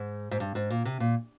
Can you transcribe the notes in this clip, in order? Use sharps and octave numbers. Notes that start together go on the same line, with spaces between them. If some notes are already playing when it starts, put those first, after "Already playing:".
Already playing: G#2
G#2
G2
G#2
A#2
C3
A#2